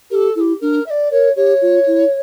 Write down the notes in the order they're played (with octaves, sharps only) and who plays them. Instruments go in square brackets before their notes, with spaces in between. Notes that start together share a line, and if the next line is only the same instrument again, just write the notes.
[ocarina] G4 [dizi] A4 A#4
[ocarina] E4 [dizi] A4
[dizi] G4
[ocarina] D4 [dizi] A#4
[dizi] E5
D5
[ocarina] A#4 [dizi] C#5
[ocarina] G4 [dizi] C#5
[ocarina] F4
E4